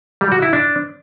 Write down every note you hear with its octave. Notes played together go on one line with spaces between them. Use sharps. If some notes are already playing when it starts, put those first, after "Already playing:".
G3
F#4
E4
D4